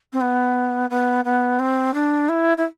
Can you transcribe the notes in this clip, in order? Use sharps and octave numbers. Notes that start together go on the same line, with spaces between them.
C4
B3
B3
B3
C4
D4
E4
E4